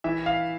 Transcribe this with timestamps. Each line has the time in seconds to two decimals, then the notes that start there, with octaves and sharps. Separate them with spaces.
0.04 E3 E5
0.26 F5